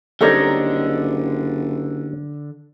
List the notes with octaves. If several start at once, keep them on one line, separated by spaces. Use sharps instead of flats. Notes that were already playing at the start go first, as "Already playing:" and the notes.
F#1 D3 G3 C4 D#4 A4 C#5 D#5